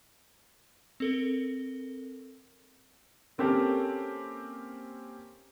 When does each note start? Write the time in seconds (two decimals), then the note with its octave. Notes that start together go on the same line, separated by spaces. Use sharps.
1.00 C4 A4 A#4
3.38 A#3 C4 C#4 G4 A4 A#4